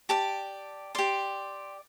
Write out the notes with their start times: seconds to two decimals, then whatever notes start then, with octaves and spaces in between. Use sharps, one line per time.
0.09 G4 D5 A5
0.95 G4 D5 C6